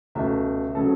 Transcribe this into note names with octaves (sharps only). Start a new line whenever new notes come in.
C#2 B2 A3 E5
C#3 F#3 A4